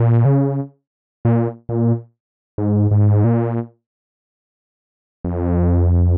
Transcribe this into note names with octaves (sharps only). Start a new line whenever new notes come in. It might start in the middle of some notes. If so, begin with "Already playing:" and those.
Already playing: A#2
C#3
A#2
A#2
G#2
G#2
A#2
F2